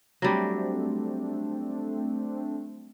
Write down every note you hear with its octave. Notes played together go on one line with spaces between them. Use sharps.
F#3 G3 A3 C4 D4